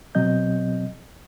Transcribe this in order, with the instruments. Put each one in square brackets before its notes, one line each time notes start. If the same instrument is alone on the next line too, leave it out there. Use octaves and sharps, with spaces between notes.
[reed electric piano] B2 F#3 C4 D#5 G6